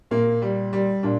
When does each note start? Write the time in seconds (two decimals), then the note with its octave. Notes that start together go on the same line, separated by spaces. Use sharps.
0.11 A#2 A#3
0.42 G3
0.73 G3
1.03 A#2 D4